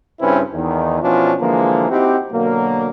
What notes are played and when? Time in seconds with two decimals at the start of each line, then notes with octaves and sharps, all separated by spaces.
0.20 G2 C#3 C4 C#4 E4 B4
0.53 E2 D#3
1.02 B2 F3 C#4 D4 E4 F4
1.40 D3 E3 F3 G#3 A#3
1.91 C4 D#4 E4 F#4 G4
2.31 B2 D3 F#3 A#3